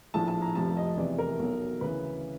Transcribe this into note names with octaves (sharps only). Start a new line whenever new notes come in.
A#1 A2 F3 A5
A5
A#5
F1 F2 C3 F3 A5
D#5
E2 C3 E3 D5
A#4
B1 B2 F#3
D2 C#3 E3 B4